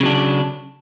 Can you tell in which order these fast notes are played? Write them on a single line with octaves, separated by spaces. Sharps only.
C#3 F#3 D4